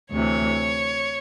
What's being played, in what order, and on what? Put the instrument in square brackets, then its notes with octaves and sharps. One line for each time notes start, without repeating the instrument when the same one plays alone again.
[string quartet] D2 C3 E3 C#5